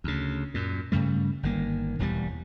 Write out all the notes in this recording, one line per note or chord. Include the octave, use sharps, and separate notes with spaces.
D2 C#3
F#2 A#2
G2 C#3 G3 A3
G1 D#3 A#3
E1 E2 F3 G3